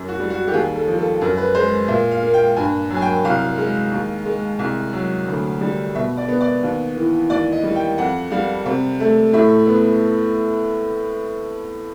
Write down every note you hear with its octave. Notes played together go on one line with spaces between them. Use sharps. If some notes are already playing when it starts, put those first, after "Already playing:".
Already playing: F#2
F#4
G3
F#4
G4
D#2 G#4
A4
F3
A4
F#2 A#4
B4
G#3 C5
A#2 E5
F5
A#3
G5
G2 G#5
F#3
G#5
G5
C2 F5
G#3
D#2
G#3
C2
F#3
D2
G3
B2 E5
D5
B3
D5
D#2
E3
D#2 D5
D#5
G3
G5
F2 F#5
G3 F5
C3
A3
A2 E5
B3